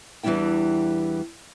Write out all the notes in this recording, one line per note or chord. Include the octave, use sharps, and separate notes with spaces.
E2 E3 G3 D4 E4 G5